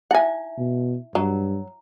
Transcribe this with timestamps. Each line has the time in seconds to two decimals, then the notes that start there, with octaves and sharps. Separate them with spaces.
0.11 D#4 E4 E5 F#5 G#5
0.58 B2
1.15 G2 F#3 A#5